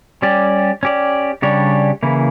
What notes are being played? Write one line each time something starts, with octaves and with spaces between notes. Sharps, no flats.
G3 C#4 G4 D5
C#4 G4 D5
C#3 G3 D4 G4 C#5
C#3 E3 A#3 E4